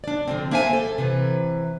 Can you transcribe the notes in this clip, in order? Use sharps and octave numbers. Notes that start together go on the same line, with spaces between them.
D4 D5
D3 F3 C4
A#3 D4 C5 E5 F#5 G#5
A4
C3 E3 B4